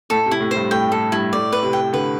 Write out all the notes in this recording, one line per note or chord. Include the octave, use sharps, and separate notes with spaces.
A2 A4
C3
E4
A2
C5
G2
A2 G5
A2 A4
G2 E4
A2 D5
B4
C3
G5
D3 B4